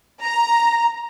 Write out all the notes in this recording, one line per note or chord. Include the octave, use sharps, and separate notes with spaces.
A#5